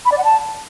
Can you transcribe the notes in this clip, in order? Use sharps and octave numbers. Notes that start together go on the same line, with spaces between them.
B5
D5
F#5
A5